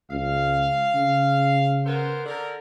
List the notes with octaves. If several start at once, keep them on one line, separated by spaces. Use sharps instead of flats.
C#2 F5
C#3
B3 A#4 C5
D3 A#4